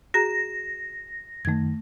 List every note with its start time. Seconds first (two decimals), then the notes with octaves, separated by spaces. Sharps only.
0.14 F#4 G#4 A#5 A#6
1.45 F#2 D#3 A3 G#6